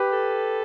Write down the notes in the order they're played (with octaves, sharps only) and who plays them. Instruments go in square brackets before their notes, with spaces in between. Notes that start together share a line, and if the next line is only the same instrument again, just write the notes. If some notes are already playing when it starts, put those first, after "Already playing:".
Already playing: [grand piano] G4 B4
[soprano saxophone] A4